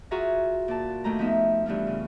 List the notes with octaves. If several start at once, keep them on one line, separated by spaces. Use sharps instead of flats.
F4 F#4 G#4 E5 A#5
A#2 A5
D#2 A3 A#5
F3 B3 D#4 E5
G2 E3 A3 F4
C#3